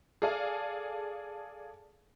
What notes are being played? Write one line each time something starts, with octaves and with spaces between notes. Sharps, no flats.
G#4 A4 D5 F5 G#5